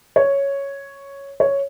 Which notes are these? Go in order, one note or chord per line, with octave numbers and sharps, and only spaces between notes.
C#5
C#5